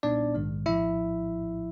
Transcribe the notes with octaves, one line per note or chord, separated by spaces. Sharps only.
B1 A#2 G3 B3 D4 D#4 D5
A#1 G#2 D#3 G#3
A#1 A2 F3 E4 E5